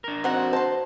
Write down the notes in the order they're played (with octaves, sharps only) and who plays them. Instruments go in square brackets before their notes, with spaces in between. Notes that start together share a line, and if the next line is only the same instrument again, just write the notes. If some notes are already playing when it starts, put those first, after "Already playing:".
[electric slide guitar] D4 A#4
[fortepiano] C4 [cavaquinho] D#4 F#5 [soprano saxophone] F#4
[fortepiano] C5 [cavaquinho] A5 C6